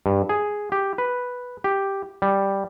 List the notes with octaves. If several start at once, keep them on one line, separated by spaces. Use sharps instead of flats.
G2
G#4
G4
B4
G4
G3